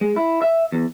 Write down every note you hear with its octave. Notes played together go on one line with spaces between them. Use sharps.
G#3
E4
E5
E2